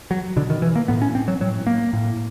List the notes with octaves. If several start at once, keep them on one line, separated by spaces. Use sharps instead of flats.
F#3
B2 D3
D#3
E3
A#3
A2 B3
C#4
C4
F#3
A2 F#3
A#3
A2